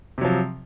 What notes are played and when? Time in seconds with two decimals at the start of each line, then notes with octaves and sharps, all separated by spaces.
0.18 C3
0.21 F#3
0.25 F3